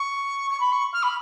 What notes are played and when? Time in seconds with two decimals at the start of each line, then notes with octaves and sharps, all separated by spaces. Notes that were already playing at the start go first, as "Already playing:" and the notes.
Already playing: C#6
0.51 C#6
0.60 B5
0.72 C#6
0.93 F6
1.03 B5